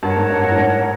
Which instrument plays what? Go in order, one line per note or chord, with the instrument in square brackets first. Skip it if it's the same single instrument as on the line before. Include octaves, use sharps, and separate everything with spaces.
[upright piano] G2 [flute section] A#4 C#5 F#5 A5
[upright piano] G#2
G2
G2
A2
G#2